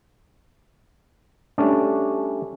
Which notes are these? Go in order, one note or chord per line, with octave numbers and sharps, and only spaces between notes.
G3 A3 C#4 D4